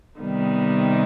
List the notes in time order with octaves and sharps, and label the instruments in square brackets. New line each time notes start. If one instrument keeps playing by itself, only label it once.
[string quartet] C3 D#3 G3 B3 D#4